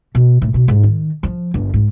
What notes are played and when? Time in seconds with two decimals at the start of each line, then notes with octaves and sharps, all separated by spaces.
0.15 B2
0.42 A2
0.54 B2
0.68 G#2
0.83 D#3
1.23 F3
1.54 G1
1.74 G#2